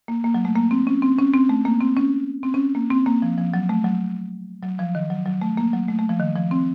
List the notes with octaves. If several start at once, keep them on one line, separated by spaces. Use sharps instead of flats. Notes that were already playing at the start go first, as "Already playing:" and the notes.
A#3
A#3
F#3
A3
A#3
C4
C#4
C4
C#4
C4
A3
A#3
C4
C#4
C4
C#4
A#3
C4
A#3
F3
F3
F#3
A3
F#3
F#3
F3
D#3
F#3
F#3
A3
A#3
F#3
A3
A3
F3
D#3
F3
C4